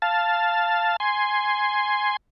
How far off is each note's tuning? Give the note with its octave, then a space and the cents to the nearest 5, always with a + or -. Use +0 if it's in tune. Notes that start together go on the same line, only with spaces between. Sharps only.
F5 -5 A5 +0
G#5 +0 C6 +0